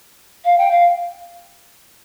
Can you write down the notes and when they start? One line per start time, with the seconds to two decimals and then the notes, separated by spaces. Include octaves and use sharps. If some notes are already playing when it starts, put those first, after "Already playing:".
0.45 F5
0.58 G5
0.71 F5